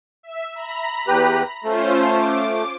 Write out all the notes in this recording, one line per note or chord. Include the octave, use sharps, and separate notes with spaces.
E5
A#5 B5
E2 G4 B4
A3 C#4 F4 C5
D6